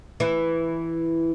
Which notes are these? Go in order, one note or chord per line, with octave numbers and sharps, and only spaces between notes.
E3 E4